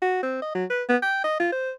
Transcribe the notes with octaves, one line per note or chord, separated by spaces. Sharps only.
F#4
C4
D#5
F#3
B4
B3
G5
D#5
F4
C5